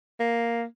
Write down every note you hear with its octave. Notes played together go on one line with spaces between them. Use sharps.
A#3